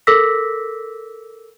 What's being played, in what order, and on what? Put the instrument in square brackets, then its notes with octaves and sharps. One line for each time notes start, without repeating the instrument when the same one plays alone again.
[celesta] A4 A#4 D6 E6 A#6 B6